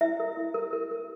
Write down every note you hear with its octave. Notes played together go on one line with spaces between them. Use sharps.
E4 E5
A#4
E4
A#4
A#4
A#4